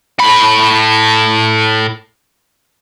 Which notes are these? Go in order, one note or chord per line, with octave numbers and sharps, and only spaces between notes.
A2 B5